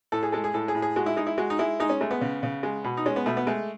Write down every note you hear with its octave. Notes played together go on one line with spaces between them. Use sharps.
A2 A4
G#4
G#3 A4
G#4
A2 A4
G#4
A2
G#4
G#3 F#4
E4
G#3 D#4
E4
G#3 F#4
D#4
G#3 E4
G#3 D#4
C#4
G#3 A3
B3
C#3
C#3
G#3
B2
D#4
G#3 C#4
B3
B2 A3
B3
G#3 A3